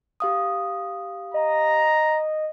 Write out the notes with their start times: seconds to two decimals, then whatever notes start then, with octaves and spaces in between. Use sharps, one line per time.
0.20 G4 F5 D#6
1.34 D#5 A#5